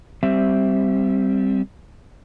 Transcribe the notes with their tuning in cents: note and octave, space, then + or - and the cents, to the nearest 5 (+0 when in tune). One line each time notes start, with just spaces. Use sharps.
G3 +0 C4 +0 E5 +0